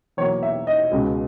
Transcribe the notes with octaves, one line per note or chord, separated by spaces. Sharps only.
E2 B2 F#3 A#3 C#5
E5
D#5
C#2 B2 G#3